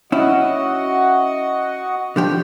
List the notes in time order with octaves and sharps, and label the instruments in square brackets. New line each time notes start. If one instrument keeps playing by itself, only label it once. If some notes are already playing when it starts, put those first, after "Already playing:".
[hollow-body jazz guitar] C#4 E4 [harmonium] F#4 D#5 F#5
[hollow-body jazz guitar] D3 F3 G4